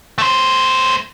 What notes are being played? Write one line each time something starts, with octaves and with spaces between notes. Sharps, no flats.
A3 C5